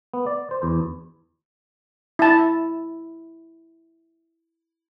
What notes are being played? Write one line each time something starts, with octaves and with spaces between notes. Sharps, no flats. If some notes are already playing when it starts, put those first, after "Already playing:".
B3
D5
C5
E2
E4 A5